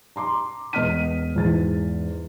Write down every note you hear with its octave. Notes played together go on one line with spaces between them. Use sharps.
A#5 C6 D6
E1 B3 D#5 F6 B6 D#7
E2 G#2 A6